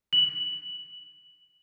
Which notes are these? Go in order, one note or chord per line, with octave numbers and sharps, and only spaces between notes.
F#7